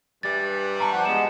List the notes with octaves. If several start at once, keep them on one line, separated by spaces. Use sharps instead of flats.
G2 E3 G3 A6
A5 A#5 C#6
F3 F#5
G#3 B3 E7